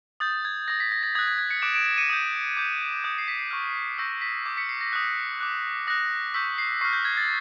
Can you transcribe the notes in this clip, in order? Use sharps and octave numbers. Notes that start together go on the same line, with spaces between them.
D#6 G6 A6
G#6
D#6 G6 A#6
B6
A#6
A6
D#6 F#6 G#6
G#6
G#6
B6 C#7
D6 F#6 D7 E7
D7 E7
D7 E7
C#7 D#7
D#6 G6
D6 G6
D#6 G6
C7
B6
C7
C#6 F6
C#6 E6 G6 A#6
B6
D6 G6
B6 C#7
C7
A#6
D#6 F#6
D6 F#6
D#6 F#6 A#6
C#6 E6 G6 B6
C7
C#6 F6 C7
G6
G#6
A6